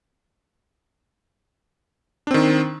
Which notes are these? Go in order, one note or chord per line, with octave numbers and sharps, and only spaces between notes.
D#3 C4 D4